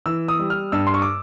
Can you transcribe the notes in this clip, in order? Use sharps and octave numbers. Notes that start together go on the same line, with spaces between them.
E3 E6
D#6
G3
F6
G2 E6
C6
C#6
D6